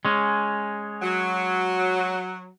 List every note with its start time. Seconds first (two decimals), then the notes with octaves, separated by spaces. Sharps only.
0.05 G#3 C#4
1.02 F#3